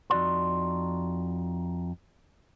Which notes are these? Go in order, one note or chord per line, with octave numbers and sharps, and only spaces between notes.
F2 D#4 F#4 D5 F#5 C6